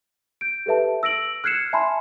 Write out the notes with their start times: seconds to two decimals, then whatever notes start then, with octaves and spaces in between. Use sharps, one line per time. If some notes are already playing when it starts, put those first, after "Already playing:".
0.41 G6 D7
0.66 G4 A4 B4 E5 A5
1.03 E6 A#6 D7 F#7
1.44 F6 F#6 G#6 C7 C#7 E7
1.73 E5 G#5 A5 B5 C6 F6